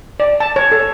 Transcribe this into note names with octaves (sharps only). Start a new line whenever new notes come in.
D5
A5
C#5
A4